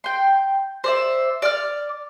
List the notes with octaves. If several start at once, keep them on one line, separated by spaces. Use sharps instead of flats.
G5 C6
C5 D5 E5
D5 D6 F6